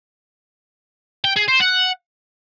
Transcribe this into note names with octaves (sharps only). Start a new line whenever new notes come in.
G5
G#4
C5
F#5